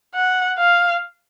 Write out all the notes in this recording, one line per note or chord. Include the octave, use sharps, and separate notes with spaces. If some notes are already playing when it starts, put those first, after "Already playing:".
F#5
F5